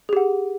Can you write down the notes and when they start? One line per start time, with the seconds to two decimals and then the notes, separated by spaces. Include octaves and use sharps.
0.09 G#4
0.13 G4
0.17 F#5